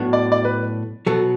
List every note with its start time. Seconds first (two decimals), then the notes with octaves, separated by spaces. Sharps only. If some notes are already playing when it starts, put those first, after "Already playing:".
Already playing: A2 F#3 B3 D4 F#4
0.13 D5
0.32 D5
0.45 B4
1.06 B2 F#3 B3 A4